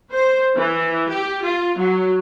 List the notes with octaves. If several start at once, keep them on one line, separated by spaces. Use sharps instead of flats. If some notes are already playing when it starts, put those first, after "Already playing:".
C5
E3
G4
F4
F#3